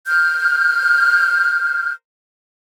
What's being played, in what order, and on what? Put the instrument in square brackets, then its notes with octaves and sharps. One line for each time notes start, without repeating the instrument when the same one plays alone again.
[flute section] F6 G6